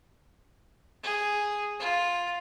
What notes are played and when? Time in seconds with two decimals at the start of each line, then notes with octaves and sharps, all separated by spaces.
1.03 G#4
1.79 F4